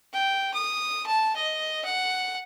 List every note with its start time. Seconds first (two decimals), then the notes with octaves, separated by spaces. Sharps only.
0.13 G5
0.54 D#6
1.07 A5
1.36 D#5
1.85 F#5